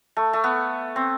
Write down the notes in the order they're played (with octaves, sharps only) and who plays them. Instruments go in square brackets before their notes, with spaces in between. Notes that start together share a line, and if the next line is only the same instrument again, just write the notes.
[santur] A3
A3
B3
C4